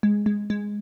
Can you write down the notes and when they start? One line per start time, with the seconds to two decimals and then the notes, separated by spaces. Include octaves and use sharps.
0.03 G#3
0.26 G#3
0.50 G#3